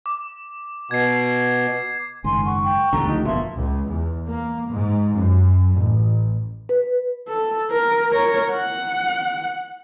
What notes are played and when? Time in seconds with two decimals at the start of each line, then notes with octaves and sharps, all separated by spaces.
0.06 D6
0.91 B2 G#6 C7
2.24 F#1 G#2 D#3 G#5 C6
2.46 F#5 C#6
2.64 G5
2.93 B1 E2 A2 D3 A3 G4 A#5
3.06 C#2 E3 F3 D#4
3.25 G1 F2 B2 A#3 E5 A5 C6
3.56 C#2
3.89 E2
4.28 A#3
4.70 G#2
5.15 F#2
5.77 A1
6.69 B4
7.28 A4
7.71 A#4
8.12 A#4 C#5
8.51 F#5